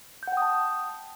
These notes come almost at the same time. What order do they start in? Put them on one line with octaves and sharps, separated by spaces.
G6 F#5 G5 D#6 A5